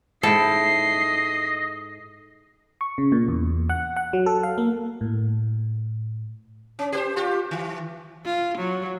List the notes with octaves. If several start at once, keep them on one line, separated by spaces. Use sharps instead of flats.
G#2 E4 A4 D#5 G5 C7
C#6
C#3
A#2
E2
F#5
F#5
F#3
A4
F5
A#3
A2
C#4
G4 B4 C5
F4 G4
D#3
F4
F#3